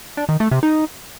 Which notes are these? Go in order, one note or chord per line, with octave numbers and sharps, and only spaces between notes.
D4
D#3
A3
C3
D#4